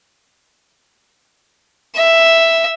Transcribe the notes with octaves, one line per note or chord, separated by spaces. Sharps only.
E5